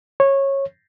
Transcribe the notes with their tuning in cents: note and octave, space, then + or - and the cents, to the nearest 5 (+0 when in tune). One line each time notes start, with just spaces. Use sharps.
C#5 -15